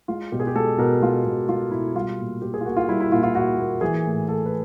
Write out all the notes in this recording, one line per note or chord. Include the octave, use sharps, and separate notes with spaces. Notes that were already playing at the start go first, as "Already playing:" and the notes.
G#3 F4
B2 G4
G#4
G4
G#3 A4
B2 A#4
G#3 F4
B2
G#3 F4
B2 E4
G3 F4
A#2
A#2 G4
G#4
F4
A#3 F#4
F4
G3 E4
E4
A#2 F4
F4
A#2 F#4
A#3
E3 G#4
A2
A2 A4
B4